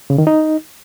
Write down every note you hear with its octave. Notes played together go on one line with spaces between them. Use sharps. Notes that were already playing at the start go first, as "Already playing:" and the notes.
C#3
D#3
D#4